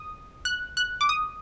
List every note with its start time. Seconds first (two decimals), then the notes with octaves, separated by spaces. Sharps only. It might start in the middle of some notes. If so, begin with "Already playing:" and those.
Already playing: D#6
0.45 F#6
0.77 F#6
1.01 D6
1.09 D#6